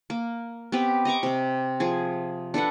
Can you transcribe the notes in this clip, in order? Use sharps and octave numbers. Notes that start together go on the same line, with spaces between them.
A#3
B3 C4 G4 B4
D#5 A#5 C#6 D6
C3 C4
F3 G#4
D4 A4 B4 F#5